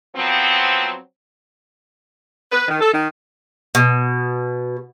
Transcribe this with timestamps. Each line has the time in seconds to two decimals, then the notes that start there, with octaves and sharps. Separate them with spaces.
0.15 F3 F#3 B3 C4
2.52 B4
2.68 D#3
2.80 A4
2.93 D#3
3.75 B2